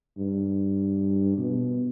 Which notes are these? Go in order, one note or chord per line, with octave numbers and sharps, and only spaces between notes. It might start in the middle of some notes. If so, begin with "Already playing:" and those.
G2
B2